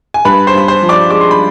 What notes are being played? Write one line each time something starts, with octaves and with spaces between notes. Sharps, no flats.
G#5
G2 B4 B5
C5 C6
G2 B5
C5 C6
F3
D5 D6
G#3 D6
C6
B5